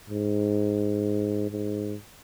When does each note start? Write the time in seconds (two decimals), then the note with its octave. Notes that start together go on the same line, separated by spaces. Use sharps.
0.10 G#2
1.51 G#2